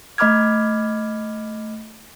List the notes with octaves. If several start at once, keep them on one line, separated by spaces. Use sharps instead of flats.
A3 D#5 B5 D6 F6 G#6